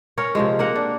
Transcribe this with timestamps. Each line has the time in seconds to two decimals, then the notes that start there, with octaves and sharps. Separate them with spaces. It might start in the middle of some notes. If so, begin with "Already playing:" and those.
0.18 C#4 A#4 C#5
0.35 C3 F3 G#3
0.59 A#3 A#4 F#5
0.76 D4